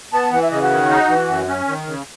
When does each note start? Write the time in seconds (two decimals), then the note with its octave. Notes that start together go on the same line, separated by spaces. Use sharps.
0.13 B3 A5
0.31 E3 F#5
0.41 E5
0.51 C#3 D#5
0.61 F#4
0.71 D#3
0.89 D#4
1.09 E3
1.28 F#2
1.47 C#4
1.68 D#3
1.87 C#3